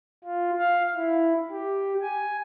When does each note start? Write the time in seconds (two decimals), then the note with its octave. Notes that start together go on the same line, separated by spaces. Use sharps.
0.25 F4
0.59 F5
0.96 E4
1.51 G4
2.02 G#5